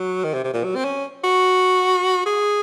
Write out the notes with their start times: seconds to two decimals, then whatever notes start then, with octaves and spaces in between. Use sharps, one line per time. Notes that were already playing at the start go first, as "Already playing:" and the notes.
Already playing: F#3
0.24 D#3
0.34 C3
0.44 C3
0.53 A#2
0.64 F#3
0.75 C4
0.84 C#4
1.24 F#4
2.26 G#4